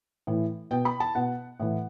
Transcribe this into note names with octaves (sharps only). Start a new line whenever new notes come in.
A2 E3
B2 G5
B5
A5
B2 F#5
A2 E3